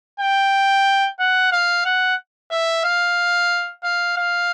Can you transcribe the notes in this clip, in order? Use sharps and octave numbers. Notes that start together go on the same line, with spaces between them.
G5
F#5
F5
F#5
E5
F5
F5
F5